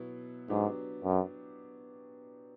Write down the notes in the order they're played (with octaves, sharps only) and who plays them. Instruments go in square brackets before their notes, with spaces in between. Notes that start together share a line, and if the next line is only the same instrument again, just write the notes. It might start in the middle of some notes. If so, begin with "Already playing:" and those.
Already playing: [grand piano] B2 F#3 B3 E4
[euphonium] G#2 [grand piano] F#3 B3 D4 G4
[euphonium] F#2